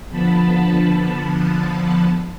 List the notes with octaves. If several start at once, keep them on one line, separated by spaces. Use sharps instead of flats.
D3 F3 B3 A5 B5